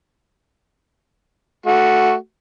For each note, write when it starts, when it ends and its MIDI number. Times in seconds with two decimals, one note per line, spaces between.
1.66 2.14 57
1.66 2.14 66